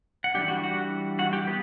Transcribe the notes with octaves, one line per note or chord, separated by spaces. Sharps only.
F#5
E3 G3 D4 G4 G5
F#4 F#5
F#4 F#5
F#4 F#5
G4 G5
B3 B4